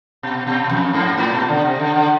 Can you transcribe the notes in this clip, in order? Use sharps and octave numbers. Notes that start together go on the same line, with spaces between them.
B2
B2
F2
G#2
A2
B2
D3
C3
D3
D3